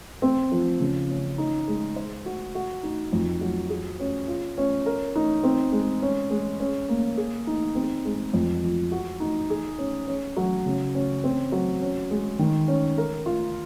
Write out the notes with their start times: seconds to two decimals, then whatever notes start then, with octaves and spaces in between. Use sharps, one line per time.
0.22 C4
0.52 F3
0.80 C#3
1.09 C#4
1.38 D#4
1.68 G#3
1.96 C5
2.26 F#4
2.55 F#4
2.83 D#4
3.13 F2
3.41 F#3
3.70 G#4
4.00 C#4
4.28 F4
4.58 C#4
4.86 A#4
5.16 D#4
5.43 C4
5.72 G#3
6.02 C#4
6.30 G#3
6.60 C#4
6.89 A#3
7.17 G#4
7.47 D#4
7.75 C4
8.05 G#3
8.33 F2
8.63 F3
8.91 F#4
9.20 D#4
9.50 G#4
9.78 C#4
10.08 C#4
10.37 F#3
10.66 C#3
10.95 C#4
11.24 C4
11.52 F#3
11.82 C#4
12.11 G#3
12.39 D#3
12.68 C#4
12.98 A#4
13.26 F4